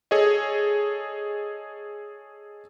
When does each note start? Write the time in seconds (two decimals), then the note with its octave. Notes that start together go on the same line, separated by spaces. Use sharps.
0.11 G#4 A4 C#5 D#5